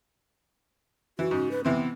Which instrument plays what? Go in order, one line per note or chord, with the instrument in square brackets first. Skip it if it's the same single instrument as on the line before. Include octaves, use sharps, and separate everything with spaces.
[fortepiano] E3 [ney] F#4
[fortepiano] G#2 C#3
[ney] B4
[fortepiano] C3 E3 C4 [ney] B3